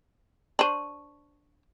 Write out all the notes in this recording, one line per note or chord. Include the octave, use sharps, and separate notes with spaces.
D4 C5 C#6 D#7 F#7